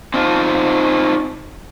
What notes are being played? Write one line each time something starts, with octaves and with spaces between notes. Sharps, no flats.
C4 D#4 F4